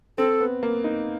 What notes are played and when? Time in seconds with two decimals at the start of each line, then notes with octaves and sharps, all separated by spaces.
0.18 C4 A4
0.40 B3
0.63 A#3
0.84 D#4